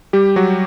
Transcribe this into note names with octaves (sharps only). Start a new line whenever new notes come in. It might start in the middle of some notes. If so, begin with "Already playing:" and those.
G3 G4
F#3 F#4